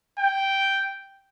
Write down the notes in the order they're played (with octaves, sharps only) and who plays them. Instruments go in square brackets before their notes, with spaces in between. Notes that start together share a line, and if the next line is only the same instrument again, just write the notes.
[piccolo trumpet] G5